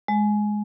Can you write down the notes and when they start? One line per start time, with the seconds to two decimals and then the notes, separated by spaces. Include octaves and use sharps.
0.08 G#3